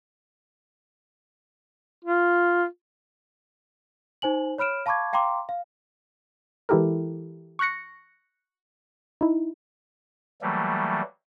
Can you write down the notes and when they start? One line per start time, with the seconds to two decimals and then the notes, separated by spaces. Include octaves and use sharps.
2.04 F4
4.22 D#4 C5 G#5 F#7
4.58 C#5 B5 F6 D7 E7
4.86 F5 A5 B5 C#6 D6 G#6
5.13 F5 G5 A#5 C6 D6
5.49 F5
6.69 E3 G#3 E4 G4 A4 A#4
7.59 C#6 F6 F#6 A#6 C#7
9.21 D#4 E4
10.42 E3 F#3 G3 A3 A#3